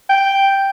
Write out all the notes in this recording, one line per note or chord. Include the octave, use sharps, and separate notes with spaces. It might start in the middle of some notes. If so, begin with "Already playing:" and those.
G5